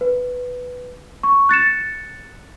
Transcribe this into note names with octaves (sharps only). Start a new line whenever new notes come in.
B4
C#6
F#6 A6 C#7 E7